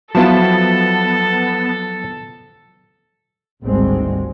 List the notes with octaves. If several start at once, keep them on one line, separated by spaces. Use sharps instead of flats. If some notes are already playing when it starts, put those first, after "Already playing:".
F3 F#3 B3 E4 F4 A4 A5
G#1 D2 G3 G#3 C4